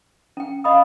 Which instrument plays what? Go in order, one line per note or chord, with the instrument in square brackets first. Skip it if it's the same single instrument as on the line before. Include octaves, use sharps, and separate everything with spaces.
[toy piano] C#4 G5
[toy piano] D#5 B5 D#6 [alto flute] F5